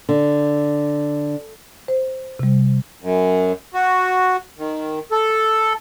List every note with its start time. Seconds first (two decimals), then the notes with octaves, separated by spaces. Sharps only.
0.09 D3
1.88 C5
2.39 C3 G3
3.02 F#2
3.74 F#4
4.58 D#3
5.11 A4